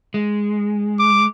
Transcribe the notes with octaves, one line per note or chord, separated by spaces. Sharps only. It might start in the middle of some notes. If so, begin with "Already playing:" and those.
G#3
D6